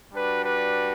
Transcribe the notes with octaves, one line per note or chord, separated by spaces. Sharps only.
G3 D4 F#4 B4
B4